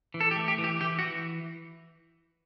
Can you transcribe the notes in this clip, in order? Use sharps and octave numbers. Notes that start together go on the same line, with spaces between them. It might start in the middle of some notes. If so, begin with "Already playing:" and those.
E3
A4
G4
A3
G4
E3
G4
E3 G4
F#4
E3